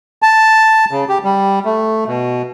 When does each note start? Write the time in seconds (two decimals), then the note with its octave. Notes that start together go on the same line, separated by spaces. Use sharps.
0.22 A5
0.91 C#3
1.09 G4
1.24 G3
1.65 A3
2.08 B2